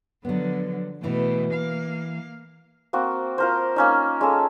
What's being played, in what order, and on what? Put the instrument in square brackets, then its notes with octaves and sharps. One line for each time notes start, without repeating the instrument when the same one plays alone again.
[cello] D3 F3 [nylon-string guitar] F#3 B3
[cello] B2 A3 [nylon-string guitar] E3 E4
[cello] A#3 F5
[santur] A#3 C4 F#4
F4 A#4 C5
A#3 C#4 D#4
G#3 C#4 A4